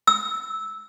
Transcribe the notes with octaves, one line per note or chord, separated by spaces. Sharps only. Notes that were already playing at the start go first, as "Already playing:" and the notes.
E6